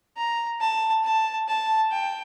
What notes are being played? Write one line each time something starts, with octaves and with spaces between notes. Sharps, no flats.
A#5
A5
A5
A5
G5